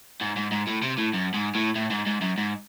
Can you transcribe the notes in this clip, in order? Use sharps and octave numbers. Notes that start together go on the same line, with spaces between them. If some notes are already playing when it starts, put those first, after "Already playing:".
G#2
G#2
G#2
A2
C3
A2
F#2
G#2
A2
A2
G#2
G#2
F#2
G#2